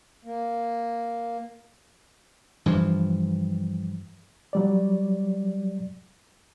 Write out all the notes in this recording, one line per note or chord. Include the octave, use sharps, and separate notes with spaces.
A#3
G2 E3 F3
F#3 G3 D5